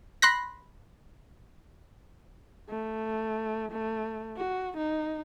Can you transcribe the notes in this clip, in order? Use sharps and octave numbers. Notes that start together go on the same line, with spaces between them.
B5 C6 F#6 A#6
A3
A3
F#4
D#4